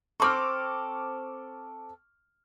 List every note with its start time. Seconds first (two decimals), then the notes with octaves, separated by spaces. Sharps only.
0.20 C4 A4 C#6 D6 F6